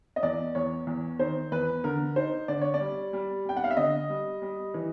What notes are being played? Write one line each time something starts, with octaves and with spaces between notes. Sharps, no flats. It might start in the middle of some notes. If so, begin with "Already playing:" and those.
D#5
E2 D5
E2 C#5
E2
D#3 C5
E2 B4
D3 A#4
D#4 C5
D3 D5
C#5
D5
G3
G3
G3 G5
F#5
F5
E5
D3 D#5
G3
G3
E3